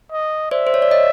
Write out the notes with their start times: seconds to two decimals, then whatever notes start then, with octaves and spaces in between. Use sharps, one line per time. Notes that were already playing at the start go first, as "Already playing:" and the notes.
0.12 D#5
0.51 C5 D5 E5
0.67 C5
0.74 C#5
0.82 D5
0.91 C#5 D#5